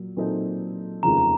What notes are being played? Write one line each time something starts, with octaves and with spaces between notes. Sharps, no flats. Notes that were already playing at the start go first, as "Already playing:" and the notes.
Already playing: A#2 F#3
A#2 F#3 C4 D#4 A4
F1 D#2 C#3 F3 A#5